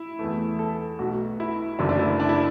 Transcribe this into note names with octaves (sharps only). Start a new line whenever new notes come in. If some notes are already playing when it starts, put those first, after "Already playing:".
Already playing: E4
E2 E3 A3
A4
B1 B2 A3 F#4
E4
F#1 F#2 D3 A3 D4
D4
E4
D4
E4